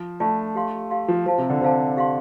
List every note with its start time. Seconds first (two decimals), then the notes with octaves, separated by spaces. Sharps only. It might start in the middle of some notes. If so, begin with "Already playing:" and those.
Already playing: F3
0.20 A3 D4 F4 D5 A5
0.55 G4 F5 C6
0.90 G4 F5 C6
1.08 F3
1.26 F3 C5 F5 A5
1.38 C3
1.50 D3
1.61 C3 C5 F5 A5
1.97 G4 F5 C6